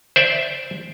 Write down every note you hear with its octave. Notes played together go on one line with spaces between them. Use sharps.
C5 D5 E5